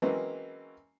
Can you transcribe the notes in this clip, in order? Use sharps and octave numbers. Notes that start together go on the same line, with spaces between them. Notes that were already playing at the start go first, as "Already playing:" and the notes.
E3 F#3 G#3 A#3 C4 C#4